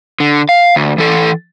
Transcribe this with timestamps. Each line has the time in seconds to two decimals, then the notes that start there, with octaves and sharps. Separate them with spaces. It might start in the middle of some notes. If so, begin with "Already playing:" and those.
0.20 D3
0.49 F5
0.76 D2
0.98 E3 A4